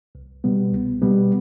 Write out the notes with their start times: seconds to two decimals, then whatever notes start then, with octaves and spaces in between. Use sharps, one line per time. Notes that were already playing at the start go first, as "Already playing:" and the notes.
0.15 C2
0.44 B2 G3 B3
0.73 C2
1.02 B2 G3 B3